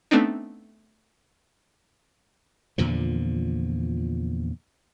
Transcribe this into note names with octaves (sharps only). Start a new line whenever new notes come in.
A3 B3 C4 D4 D#4
E2 A#2 D3 F3